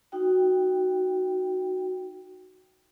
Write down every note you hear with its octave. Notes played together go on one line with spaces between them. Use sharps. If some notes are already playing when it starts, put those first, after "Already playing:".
D#4 F#4 G5